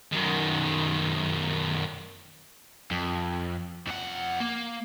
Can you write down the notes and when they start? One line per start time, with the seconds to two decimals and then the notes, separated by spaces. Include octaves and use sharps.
0.12 F#2 D#3
2.91 F2
3.87 F2 F#5
4.40 A#3